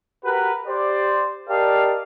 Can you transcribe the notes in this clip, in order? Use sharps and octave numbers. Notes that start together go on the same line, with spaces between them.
F#4 G4 A#4 B4
G4 C5 D5
G4 A#4 D5 D#5 F5 A5